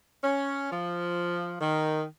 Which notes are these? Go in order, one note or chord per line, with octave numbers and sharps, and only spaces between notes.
C#4
F3
D#3